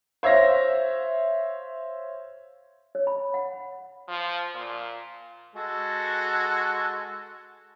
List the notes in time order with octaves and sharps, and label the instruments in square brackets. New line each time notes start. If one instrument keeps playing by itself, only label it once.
[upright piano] C5 C#5 E5 F5 A#6
[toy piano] C#5
B5
F#5
[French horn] F3
A#2
[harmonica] G#3 F#4 A4